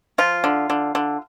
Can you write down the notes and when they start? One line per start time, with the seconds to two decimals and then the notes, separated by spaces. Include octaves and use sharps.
0.18 F3 F4
0.44 D3
0.70 D3
0.95 D3